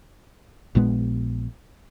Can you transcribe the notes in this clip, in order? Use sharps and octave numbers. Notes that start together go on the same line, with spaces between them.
A#1 A#2 G#3 B3